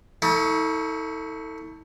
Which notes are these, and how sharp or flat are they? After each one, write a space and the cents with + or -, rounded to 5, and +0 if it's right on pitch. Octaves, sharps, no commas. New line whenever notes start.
A3 +20 E4 -45